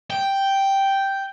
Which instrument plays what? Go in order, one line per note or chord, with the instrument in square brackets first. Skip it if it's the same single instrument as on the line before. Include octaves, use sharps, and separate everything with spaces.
[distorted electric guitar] G5